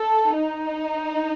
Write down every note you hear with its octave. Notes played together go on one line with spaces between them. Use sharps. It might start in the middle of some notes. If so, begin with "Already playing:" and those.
Already playing: A4
D#4